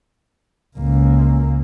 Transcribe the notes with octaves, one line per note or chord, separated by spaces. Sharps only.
C#2 A#3